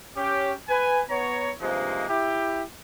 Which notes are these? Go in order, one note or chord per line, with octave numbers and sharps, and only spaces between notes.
C#4 G4
B4 G#5
B3 C#5 A#5
G2 C3 F3 G#3 A#3 D#4
E4 G4